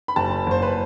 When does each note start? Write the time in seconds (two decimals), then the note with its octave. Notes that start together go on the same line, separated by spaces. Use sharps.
0.08 B5
0.16 F#1 A5
0.47 F#1 C5
0.62 B4